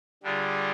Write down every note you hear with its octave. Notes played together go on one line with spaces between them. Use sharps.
D3 G3 D4 F4 G#4